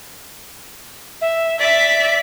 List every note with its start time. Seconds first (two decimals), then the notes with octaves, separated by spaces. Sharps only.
1.22 E5
1.60 D5 E5 B6